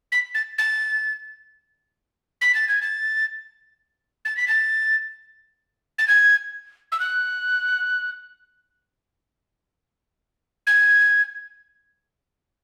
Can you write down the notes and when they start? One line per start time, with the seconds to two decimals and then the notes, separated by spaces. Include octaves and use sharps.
0.12 B6
0.35 A6
0.58 A6
2.41 B6
2.55 A6
2.68 G#6
2.82 A6
4.25 A6
4.37 B6
4.48 A6
5.98 A6
6.08 G#6
6.92 E6
7.00 F#6
10.67 G#6